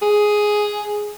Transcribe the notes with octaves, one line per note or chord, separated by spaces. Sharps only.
G#4